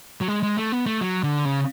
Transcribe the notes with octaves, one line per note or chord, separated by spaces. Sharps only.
F#3
G#3
G#3
A3
B3
A3
F#3
D3
C#3